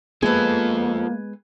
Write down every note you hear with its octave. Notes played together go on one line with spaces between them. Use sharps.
F3 G#3 A#3 B3 G#4 A4 B4